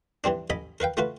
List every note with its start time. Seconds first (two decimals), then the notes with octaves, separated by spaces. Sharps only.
0.24 E3 G3 C4 D4
0.50 A1 D#5 G#5 B5
0.80 A#4 B4 F5 G5
0.97 A3 F4 F#4 B4